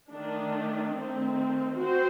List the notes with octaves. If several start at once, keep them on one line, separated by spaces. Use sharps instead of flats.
D#3 A3 D4
D#3 A3 C4
C4 F#4 C5